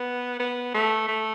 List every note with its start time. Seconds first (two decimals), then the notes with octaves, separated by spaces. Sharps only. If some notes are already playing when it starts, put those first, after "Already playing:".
Already playing: B3
0.40 B3
0.74 A3
1.08 A3